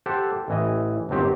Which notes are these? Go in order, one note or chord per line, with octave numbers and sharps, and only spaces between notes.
G4 A4 C5 F#5
A1 E3 D#5
G1 D#2 F#3 C4 G4